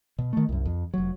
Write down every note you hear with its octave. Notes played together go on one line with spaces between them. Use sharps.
B2
D#3 A3
C2 F#2
F2
F1 F#3